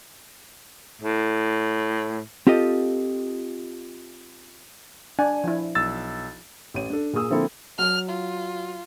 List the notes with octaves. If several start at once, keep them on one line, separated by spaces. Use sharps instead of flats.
A2
C4 F4 G4 A4 D#5
D4 G#5
F3 E4
B1 E6 A6
A1 C#5 D#7
D4 A4
A#2 A#3 G#4 D#6 E6
D3 F3 A#3 C4 E4 A4
F#3 F6
F4